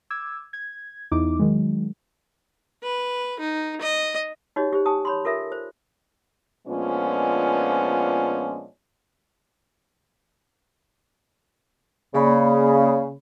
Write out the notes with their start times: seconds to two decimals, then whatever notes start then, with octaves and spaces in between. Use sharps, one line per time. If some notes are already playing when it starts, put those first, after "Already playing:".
0.10 D6 E6 G#6
0.53 G#6
1.11 E2 D#4 E4 D6
1.39 D#3 F#3 G#3
2.83 B4
3.39 D#4
3.81 D#5
4.56 D#4 F#4 G4 C#5 D#5
4.73 G4 C5
4.86 G4 G#5 A5 D#6
5.05 C#5 B5 C6
5.25 F4 A4 A#4 E5
5.52 C5
6.67 A#2 F3 G#3 B3 C#4 D4
12.14 C#3 A#3 D5 B5